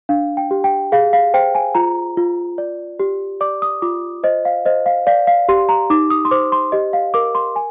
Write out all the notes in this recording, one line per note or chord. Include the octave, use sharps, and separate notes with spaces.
D4 F5
G5
G4
G5
G#4 F5
F5
C5 G5
G#5
F4 A#5
F4
D5
G4
D5 D6
D#6
F4 D6
C5 D#5
F5
C5 D#5
F5
D5 F5
F5
G4 C6
A#5
D#4 D6
D#6
C6
C5 D6
C6
G4 D#5
F5
A#4 D6
C6
G#5